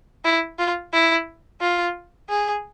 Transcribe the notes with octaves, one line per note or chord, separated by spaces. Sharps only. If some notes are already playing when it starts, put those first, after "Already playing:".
E4
F4
E4
F4
G#4